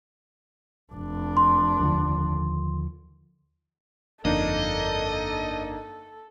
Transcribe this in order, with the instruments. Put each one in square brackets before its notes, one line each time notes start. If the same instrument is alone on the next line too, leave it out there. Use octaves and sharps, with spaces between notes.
[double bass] F1 D4
[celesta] C6
[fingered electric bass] D#2 D3 F3
[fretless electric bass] G1 F2 [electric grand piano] A#3 D4 D#4 [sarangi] A4 [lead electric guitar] D#5